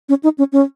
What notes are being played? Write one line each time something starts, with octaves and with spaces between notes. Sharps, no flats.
C#4
D#4
C#4
C#4